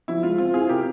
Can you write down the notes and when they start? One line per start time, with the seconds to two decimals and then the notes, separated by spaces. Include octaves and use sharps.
0.08 F3 E4
0.23 G#3 F4
0.38 C4 F4
0.54 E4 F4 G#4
0.69 C3 G4 A#4